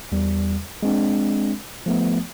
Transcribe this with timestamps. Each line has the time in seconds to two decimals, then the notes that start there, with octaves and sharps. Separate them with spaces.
0.12 E2 G3
0.83 G#3 C4 D4
1.86 F3 A3 B3